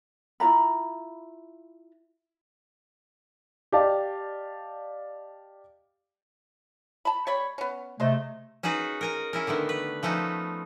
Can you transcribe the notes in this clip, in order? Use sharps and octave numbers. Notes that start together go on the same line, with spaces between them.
E4 F4 A#5 B5
G4 D5 D#5 F5 A5
A5 B5
G3 C#5 B5
B3 C#4
C3 G#3 A3 C5 D#5
C#4 D#4 F#4 G#4 B4
A#4 G#5 A#5
C#4 E4 A#4
D3 D#3 A3 B3
B4
F3 A3 B3 C#4 D#4